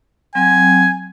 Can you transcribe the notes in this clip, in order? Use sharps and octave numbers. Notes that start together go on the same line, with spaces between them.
F#3 C4 G5 G#5